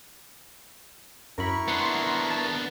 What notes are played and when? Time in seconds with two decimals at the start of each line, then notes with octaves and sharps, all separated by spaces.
1.38 F#2 E4 A#4 B5 C#6
1.68 B3 D4 F#5 C6
2.30 A5